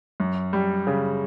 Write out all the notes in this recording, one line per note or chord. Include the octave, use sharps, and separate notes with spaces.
F#2
G3
C#3